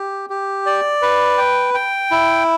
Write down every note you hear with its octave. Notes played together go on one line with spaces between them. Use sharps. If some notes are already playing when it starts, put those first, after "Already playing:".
Already playing: G4
G4
D5
B4
G5
G5
E4